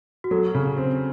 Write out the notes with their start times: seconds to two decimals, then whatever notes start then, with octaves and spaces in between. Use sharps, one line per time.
0.24 F#4
0.31 F#3 A4
0.55 C#3
0.77 C4